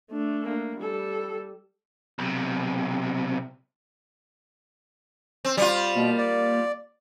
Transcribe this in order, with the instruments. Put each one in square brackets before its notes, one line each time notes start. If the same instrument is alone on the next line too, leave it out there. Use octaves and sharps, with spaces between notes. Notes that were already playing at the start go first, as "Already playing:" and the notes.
[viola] A3 D4
[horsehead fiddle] A#3
[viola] G3 [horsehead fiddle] A4
[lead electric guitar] B1 C3
[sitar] C4
G3 F4
[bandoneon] B2 [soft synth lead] A#3
[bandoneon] D5